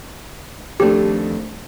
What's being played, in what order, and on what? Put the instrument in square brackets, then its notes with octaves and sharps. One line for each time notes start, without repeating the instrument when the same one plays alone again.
[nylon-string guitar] F2 D#3 A3 D4 [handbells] G4